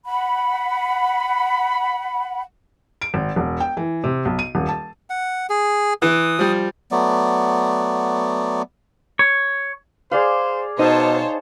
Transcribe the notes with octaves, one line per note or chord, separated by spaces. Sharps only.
F#5 B5
D7
G#1
E1
G5
E3
C3
B1
D#7
D#1
A5
F#5
G#4
E3 D#6
F3 G3
F#3 A3 B3 D5
C#5
G#4 C5 D5 F5
B2 D#4 C5 C#5 A5